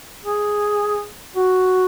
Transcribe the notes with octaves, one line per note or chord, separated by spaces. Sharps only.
G#4
F#4